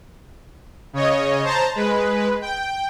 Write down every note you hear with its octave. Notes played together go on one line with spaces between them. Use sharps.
C#3 C#5 D#5
C5 A5 A#5
G#3 B4
G5